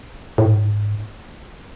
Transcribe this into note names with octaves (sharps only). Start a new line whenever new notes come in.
A2
G#2